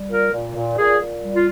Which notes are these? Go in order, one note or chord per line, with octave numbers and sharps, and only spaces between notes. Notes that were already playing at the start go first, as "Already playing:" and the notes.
Already playing: G3
A#2 A#4
A#2
A#2
A#2 G#4
A#2
G3
F4